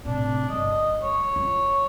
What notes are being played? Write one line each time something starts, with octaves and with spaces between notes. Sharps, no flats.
A2 C3 D4
G1 D#5
C#5
F4